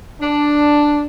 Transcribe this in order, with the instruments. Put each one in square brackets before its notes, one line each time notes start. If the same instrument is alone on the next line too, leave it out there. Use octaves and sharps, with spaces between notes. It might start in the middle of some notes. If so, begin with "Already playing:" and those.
[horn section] D4